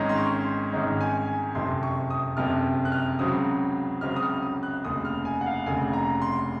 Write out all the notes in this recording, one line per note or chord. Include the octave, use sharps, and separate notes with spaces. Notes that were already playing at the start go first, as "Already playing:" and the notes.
Already playing: G#1 G#2 D#3 G#3 C#4 A#5
C6
C#6
C6
G#1 G#2 D#3 G#3 C#4 A#5
G#5
G#5
F#1 F2 C3 C6
C#6
D#6
F#1 F2 C3 F6
F#6
F6
C#2 C#3 F#3 C4 D#6
C#2 C#3 F#3 C4 F6
D#6
F6
D#6
F#6
F1 D#2 C#3 D#6
F6
G#5
F#5
F5
F1 D#2 C#3 G#5
A#5
C6